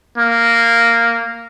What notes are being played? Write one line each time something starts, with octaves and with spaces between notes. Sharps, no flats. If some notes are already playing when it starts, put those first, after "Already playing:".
A#3